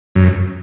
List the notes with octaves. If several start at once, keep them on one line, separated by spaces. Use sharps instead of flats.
F#2